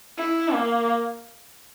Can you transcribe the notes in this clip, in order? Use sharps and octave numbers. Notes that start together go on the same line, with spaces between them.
E4
A#3